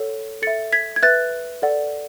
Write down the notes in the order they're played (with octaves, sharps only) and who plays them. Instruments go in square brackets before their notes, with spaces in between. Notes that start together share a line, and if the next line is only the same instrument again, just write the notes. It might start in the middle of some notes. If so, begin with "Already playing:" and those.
Already playing: [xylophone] A4 C#5 F#5
A4 A6 C#7
E5
G#6 B6
G#6
B4 E5 F#6 A6
A4 D5 F#5